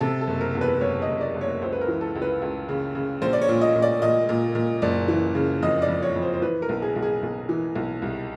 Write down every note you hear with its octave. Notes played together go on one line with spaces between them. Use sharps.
C3 A4
A4
F#1
A#4
E2
B4
F#1 C#5
D#5
F#1
D5
F#1
C#5
C#2 C5
B4
A#4
E3
A4
C#2
B4
C#2
C#3
C#3
A#1 C5
D5
C#5
A#2
D#5
A#2
D5
A#2 D#5
A#2
A#2
F#1 D5
E3
C#3
F2 D#5
D5
F2
C#5
F2
C5
C5
E3 B4
A#4
B1
G#4
B1
G#4
B1
E3
B1
C2